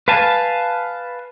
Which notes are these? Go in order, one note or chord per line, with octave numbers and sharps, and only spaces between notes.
B4 F5 G#5 A5